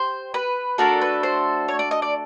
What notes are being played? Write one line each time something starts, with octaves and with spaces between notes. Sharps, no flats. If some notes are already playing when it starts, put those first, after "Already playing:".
Already playing: G4 C5
B4
A3 D4 F#4 A4 A#4
B4
C5
C#5
D5
D#5
D5